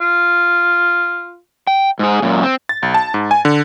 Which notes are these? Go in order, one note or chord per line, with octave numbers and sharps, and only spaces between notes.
F4
G5
G#2 G#4
F#2 A#2
C4
A6
B1
A5
G#2
G#5
D3